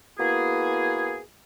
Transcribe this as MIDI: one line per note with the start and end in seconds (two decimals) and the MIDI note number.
0.19 1.19 58
0.19 1.19 59
0.19 1.19 64
0.19 1.19 66
0.19 1.19 68